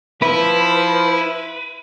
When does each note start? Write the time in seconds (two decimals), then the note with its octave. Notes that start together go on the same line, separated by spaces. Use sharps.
0.22 F3 E4 B4